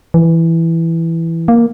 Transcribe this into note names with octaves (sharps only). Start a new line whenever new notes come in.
E3
A#3